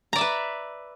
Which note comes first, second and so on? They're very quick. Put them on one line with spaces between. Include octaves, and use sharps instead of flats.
A#5 D5 E5 B4